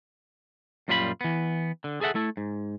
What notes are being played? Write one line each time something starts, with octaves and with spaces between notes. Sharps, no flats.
F#2 A#2 G3 F4 A4 B5
E3 B3
D3
G#4 A4 E5 F#5
A3 E4 A4
G#2